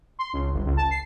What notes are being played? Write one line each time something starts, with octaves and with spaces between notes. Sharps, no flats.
C6
C#2
G1
C#2
A5
C7